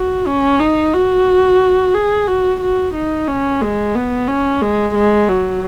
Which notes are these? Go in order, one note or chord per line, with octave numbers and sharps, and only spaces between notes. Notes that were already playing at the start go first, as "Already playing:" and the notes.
Already playing: F#4
C#4
D#4
F#4
G#4
F#4
F#4
D#4
C#4
G#3
B3
C#4
G#3
G#3
F#3